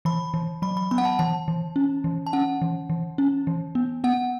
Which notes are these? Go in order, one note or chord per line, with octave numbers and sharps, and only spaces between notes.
E3 B5
E3
F#3 B5
B5
B3 B5
F#5
A5
E3 A5
E3
C#4
E3
A5
C#4 F#5
E3
E3
C#4
E3
B3
B3 F#5